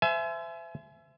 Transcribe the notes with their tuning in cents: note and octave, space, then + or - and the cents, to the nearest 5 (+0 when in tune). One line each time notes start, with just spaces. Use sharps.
C5 -30 E5 +20 G#5 +35